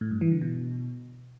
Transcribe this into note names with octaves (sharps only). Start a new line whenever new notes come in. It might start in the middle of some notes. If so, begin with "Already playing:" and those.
A2
G2
E3
D3
B2